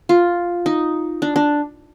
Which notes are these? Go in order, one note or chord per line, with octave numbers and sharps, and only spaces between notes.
F4
D#4
D4
D4